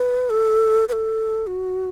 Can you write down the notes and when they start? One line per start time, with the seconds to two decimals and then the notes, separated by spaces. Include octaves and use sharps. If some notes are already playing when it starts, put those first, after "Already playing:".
Already playing: B4
0.30 A4
0.89 B4
0.93 A4
1.47 F#4